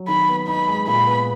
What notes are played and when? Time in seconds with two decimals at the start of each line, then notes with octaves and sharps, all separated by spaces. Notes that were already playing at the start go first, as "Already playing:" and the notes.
Already playing: F#3
0.08 D#3 B5
0.28 B3
0.48 D#4 B5
0.68 G#3
0.87 A#2 B5
1.07 B3